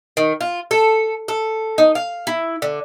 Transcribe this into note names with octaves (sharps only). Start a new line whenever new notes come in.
D#3
F4
A4
A4
D#4
F5
E4
D3